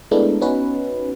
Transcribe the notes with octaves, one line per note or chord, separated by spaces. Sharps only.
G#3 A3 B3 D4 E4 A#4
B3 C#4 D#4 F#4 B4